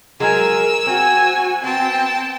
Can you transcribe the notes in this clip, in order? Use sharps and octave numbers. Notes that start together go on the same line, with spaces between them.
F#3 G#3 G#4 A#4 G#5 E6
C4 F#4 G#5
B3 C4 G5 A5